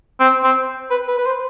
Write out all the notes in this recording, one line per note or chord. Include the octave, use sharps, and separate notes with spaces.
C4
C4
B4
B4
B4
C5